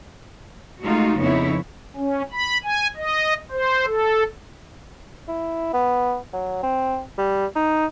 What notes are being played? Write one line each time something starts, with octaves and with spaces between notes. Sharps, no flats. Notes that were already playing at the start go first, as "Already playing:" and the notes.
G#3 A3 D#4 F4 F#4
F2 C#3 B3 D#4 E4 C#5
C#4
B5
G#5
D#5
C5
A4
E4
B3
F#3
C4
G3
D#4